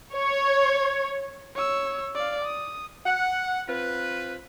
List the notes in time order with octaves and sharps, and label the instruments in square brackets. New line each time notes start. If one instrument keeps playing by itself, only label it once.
[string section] C#5
[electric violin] C#5 E6
D5 F5
D#6
[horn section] F#5
C4 F4 B4